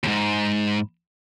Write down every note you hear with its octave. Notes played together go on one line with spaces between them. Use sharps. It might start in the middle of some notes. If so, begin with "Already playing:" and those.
D#2 G#2